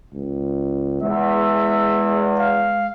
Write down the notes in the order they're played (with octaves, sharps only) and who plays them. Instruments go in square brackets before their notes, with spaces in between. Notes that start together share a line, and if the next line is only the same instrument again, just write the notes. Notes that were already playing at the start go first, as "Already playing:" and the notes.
[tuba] C#2
[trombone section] E2 [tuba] G#3 [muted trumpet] E5
[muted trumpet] F5